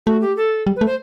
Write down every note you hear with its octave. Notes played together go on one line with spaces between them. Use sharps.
A3 F#4
G4
A4
G3
B4
A3
C5